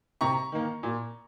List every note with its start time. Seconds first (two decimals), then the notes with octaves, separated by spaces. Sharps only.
0.21 C3 A#5 C#6
0.52 D#3 A#3
0.83 A#2